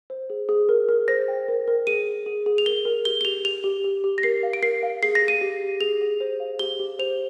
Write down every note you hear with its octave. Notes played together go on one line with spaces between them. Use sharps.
C5
G#4
G#4
A#4
A#4
C5 A#6
G5
A#4
A#4
G#4 D#7
G#4
G#4
G#4
F7
A#4 G7
A#4
G4 G7
G7
G4 F7
G4 F7
G4
G4
G4
A#6
A#4 C7
F5
D7
A#4 C7
F5
G#4 C7
A#6
G#4
D#7
G4
G4
G#4 F7
G#4
C5
F5
G4 G7
G4
C5 F7